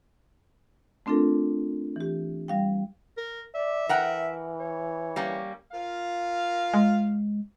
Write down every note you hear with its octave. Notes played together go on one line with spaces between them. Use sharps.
A3 C4 D4 F4 A4 A#4
E3 G4
G3 F5 G5
A#4
D5 E5
E3 A#4 F#5 G5
C#5
G3 A#3 C#4
F4 A#4 F5
G#3